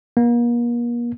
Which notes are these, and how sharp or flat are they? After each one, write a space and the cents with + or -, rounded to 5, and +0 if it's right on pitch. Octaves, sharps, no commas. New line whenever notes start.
A#3 +40